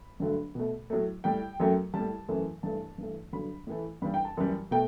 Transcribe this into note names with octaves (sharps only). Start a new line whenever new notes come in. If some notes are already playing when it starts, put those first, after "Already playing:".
Already playing: B5
G2 D3 F#3 A3
B2 A3
A2 F#3 A3
A2 G3 G5
F#2 F#3 A3
A2 G3 A5
F#2 E3 A3
G2 E3 A3 A5
G2 E3 A3
G2 D3 F#3 B5
A2 E3 A3
G2 E3 G3 B5
G5
A5
F#2 E3 G3
B2 A3 G5